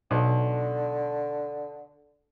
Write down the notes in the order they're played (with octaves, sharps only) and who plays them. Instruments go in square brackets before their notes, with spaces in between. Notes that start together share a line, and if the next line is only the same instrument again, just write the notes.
[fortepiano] B1 [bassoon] D3